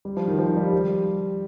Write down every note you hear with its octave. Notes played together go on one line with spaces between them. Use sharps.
G3
F3
D#3
F3
G3
G3